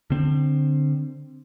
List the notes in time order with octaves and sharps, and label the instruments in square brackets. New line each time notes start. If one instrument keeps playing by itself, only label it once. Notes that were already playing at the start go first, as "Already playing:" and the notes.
[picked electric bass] D3 C4